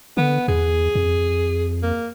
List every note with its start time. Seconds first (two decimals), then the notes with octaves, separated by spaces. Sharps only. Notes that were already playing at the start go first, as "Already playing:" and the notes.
0.17 D3 B3
0.48 E2 G#4
0.95 F2
1.83 A#3